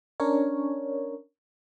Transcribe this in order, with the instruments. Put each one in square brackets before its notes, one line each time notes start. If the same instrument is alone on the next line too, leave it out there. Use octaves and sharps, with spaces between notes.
[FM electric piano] C#4 D4 A#4 C#5